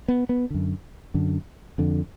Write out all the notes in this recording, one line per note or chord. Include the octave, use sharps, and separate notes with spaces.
B3
B3
F#2 D3
F#2 D3
F2 D3